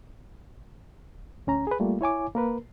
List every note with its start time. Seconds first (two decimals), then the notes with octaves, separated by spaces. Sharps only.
1.47 D2 C#4 A#5
1.67 G#4 B4
1.80 G3 A3 A#3 F4
2.01 E4 C#5 G#5 D6
2.35 A#3 A#4 B4